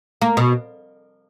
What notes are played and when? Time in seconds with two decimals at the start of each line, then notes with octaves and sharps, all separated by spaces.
0.22 A#3
0.37 B2